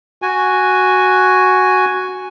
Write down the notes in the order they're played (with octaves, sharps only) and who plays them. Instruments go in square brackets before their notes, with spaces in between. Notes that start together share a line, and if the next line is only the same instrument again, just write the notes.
[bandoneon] F#4 G#5